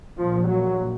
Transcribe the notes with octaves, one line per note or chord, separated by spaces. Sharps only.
A#1 A#2 F3
F#3